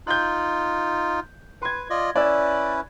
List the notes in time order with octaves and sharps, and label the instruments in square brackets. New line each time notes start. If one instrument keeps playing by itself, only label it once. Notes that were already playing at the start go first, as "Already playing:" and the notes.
[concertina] D#4 F4 [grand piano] F#6 G6
[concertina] B4 [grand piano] C6 G#6
[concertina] F4 D5 D#5
[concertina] C#4 E4 B4 [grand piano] D5 E6